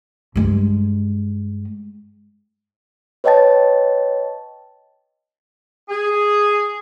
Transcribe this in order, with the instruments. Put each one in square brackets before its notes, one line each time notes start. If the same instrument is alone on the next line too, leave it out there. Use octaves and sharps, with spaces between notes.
[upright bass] G2 G#3
[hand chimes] B4 C#5 D#5 G5 A5 A6
[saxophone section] G#4